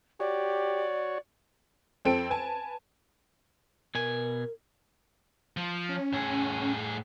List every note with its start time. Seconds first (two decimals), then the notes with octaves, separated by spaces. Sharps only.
0.20 F#4 G4 C#5 D5
2.05 F2 C4 A4 G5 D7
2.30 B4 G#5 A5
3.95 B2 A#4 G#5
5.57 F3
5.89 C#4
6.13 A2 G#4